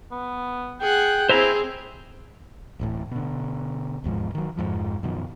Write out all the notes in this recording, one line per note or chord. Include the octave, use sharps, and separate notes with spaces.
B3
G#4 F#5 G5
C4 E4 G#4 C5 E5 A#5
D1 A1 A2
B2 D3
E1 D#2 G#2 F3
D#3 F#3
F2 G#2 F3
F#2 B2 D#3 F3